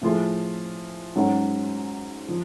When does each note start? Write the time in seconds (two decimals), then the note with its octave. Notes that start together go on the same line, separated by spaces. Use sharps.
0.01 A2 F3 A3 F4 G#4
1.16 G#2 F#3 C#4 F#4
2.28 F3